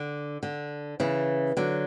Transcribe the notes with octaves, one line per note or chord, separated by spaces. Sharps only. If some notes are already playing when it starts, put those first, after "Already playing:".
Already playing: D3
D3
C#3 E3
D3 F#3